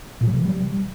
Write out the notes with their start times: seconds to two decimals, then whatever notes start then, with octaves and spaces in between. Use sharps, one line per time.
0.21 A#2
0.27 F#3
0.33 C3
0.39 F3
0.46 G3